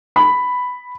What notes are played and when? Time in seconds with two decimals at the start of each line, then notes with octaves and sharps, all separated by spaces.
0.16 B5